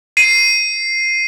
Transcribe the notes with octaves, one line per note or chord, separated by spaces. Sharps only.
C7 D#7